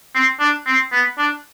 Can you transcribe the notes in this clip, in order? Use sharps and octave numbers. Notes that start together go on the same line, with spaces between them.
C4
D4
C4
B3
D4